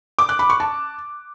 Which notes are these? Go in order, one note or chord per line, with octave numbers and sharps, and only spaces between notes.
D6
F#6
B5
C#6
A5